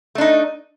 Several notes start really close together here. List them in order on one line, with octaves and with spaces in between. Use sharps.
A3 D4 D#4